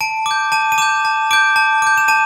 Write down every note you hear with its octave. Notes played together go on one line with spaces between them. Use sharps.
A5 D7
D6 G6
A5 D#7
D#7
D6 G6 E7
A5
D6 G6 D7
A5
D6 G6
E7
A5 D#7